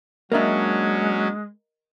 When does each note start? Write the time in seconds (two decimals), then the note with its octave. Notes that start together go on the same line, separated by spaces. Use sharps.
0.32 F#3 G#3 A#3 C#4 D4 A#4 D#5 E5